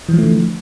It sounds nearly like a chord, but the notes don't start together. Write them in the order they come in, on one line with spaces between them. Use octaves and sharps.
E3 F3 A3 D3